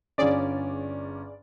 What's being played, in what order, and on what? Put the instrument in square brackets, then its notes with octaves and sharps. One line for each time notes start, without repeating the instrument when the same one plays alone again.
[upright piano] G1 C#4 [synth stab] G#4 D5